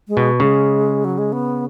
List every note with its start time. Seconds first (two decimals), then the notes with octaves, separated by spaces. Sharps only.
0.08 G#3
0.17 B2
0.40 C#3 G#3
1.05 F#3
1.18 G#3
1.33 B3